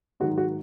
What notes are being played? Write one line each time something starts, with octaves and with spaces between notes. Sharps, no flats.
G#2 D#3 F#3 F#4
F#4